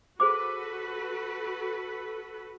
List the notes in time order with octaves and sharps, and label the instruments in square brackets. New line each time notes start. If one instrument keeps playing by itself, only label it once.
[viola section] F#4 A4 B4 [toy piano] G#4 C5 D6